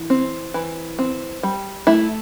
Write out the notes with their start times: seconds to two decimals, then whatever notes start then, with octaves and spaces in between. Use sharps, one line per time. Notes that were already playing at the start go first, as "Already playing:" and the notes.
Already playing: E3
0.10 C4
0.54 E3
0.99 C4
1.43 G3
1.87 A3 E4